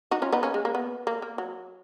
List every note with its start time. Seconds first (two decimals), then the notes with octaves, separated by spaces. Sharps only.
0.11 D#4 F#4
0.22 C#4 F4
0.32 B3 D#4
0.43 A#3 C#4
0.54 G#3
0.65 A#3
0.75 B3
1.07 A#3
1.22 A#3
1.38 F#3